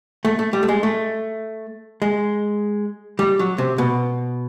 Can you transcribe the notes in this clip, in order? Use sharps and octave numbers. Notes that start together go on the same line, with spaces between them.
A3
A3
G3
A3
G#3
A3
G#3
G3
F#3
C3
B2